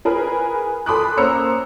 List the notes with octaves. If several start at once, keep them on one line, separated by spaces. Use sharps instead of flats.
G#4 A#4 B4
A4 B5 C6 D6 D#6 F#6
A#3 C#4 C5 A#5 E6 C#7